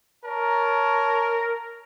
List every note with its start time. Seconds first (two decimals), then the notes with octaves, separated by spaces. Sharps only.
0.25 A#4 C#5 A5 A#5